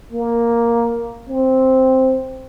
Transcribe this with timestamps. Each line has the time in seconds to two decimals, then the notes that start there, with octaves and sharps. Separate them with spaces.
0.12 A#3
1.28 C4